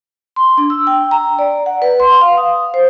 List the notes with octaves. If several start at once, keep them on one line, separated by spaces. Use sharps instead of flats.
C6
D4
E6
G5
A#5
D5
F#5
B4
C6
F5
D#6
C5